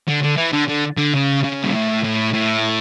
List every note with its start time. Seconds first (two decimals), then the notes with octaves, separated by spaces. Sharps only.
0.08 D3
0.23 D3
0.37 E3
0.53 D3
0.68 D3
0.97 D3
1.14 C#3
1.44 C#3
1.63 G2
1.73 A2
2.04 A2
2.33 A2